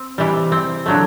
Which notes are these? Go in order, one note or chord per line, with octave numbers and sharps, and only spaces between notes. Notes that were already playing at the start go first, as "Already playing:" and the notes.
Already playing: C4
C3 E3 G3
C4
D3 F#3 A3